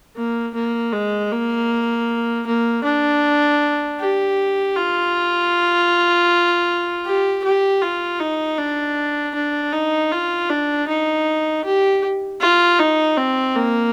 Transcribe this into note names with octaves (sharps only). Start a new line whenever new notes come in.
A#3
A#3
G#3
A#3
A#3
D4
G4
F4
G4
G4
F4
D#4
D4
D4
D#4
F4
D4
D#4
G4
F4
D#4
C4
A#3